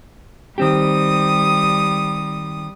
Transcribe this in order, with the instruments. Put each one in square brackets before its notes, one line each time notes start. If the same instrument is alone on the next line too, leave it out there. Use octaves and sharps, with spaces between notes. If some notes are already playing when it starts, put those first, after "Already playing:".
[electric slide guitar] D#3 C4 G4 [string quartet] G3 D#6